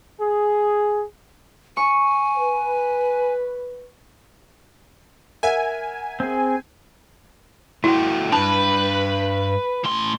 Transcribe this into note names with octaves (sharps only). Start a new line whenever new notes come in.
G#4
G#5 C#6
B4
A#4 E5 F#5 G#5
C4 G#4
A3 E4 F#4 G5
G2 E3 D4 B4 A5
A2 C6